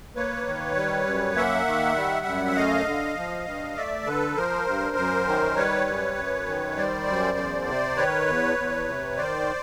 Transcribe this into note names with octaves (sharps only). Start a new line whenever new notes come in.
A#3 B4 C#5
D#3
G3
F#2
A#3 E5 F#5
D#3
G3
F#2
E5
A3 D#5 F5
D3
F3
G2
A3 D5 E5
D3 A4 B4
F3 A#4 C5
G2
F#2
D#3
G3 B4 C#5
F#2
F#2
D#3
G3 C5 D5
F#2
E2
C3
D#3 B4 C#5
E2
E2
C3
D#3 C5 D5